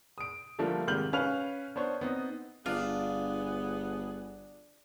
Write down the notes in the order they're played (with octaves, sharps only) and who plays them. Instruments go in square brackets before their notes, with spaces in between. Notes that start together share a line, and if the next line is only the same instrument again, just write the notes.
[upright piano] D#6 D7
D3 F3 G3 A3 A#3 F4
G#2 C3 D#3 F6 G6 F#7
C#4 B4 F5 F6 F7
B3 D4 C5 C#5
B3 C4 D#4
[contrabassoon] G1 [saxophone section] B3 G#4 [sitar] D4 [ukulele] F4